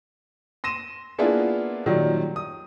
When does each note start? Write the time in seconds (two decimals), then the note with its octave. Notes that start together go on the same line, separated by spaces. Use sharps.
0.64 C6 A#6 D#7 E7
1.18 A#3 B3 D4 E4 F4 G#4
1.86 A#2 D#3 F#3 G3
2.36 D#6